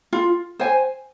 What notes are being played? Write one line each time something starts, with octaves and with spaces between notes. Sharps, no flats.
F4
C5 G#5